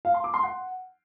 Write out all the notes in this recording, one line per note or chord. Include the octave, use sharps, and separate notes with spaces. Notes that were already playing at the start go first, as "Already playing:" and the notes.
F5
C6
D6
C6
F#5